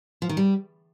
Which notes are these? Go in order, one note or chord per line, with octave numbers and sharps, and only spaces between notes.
F3
D#3
G3